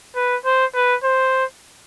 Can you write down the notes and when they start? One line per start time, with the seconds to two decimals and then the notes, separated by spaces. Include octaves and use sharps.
0.16 B4
0.45 C5
0.74 B4
1.04 C5